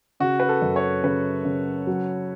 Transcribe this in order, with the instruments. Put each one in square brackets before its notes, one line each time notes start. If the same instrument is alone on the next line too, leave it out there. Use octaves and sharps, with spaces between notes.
[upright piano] C#3 [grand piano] F#4
[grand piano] B4
A4
[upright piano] F#2
[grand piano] C#5
[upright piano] C#3 [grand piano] B4
[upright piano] C#3
F#3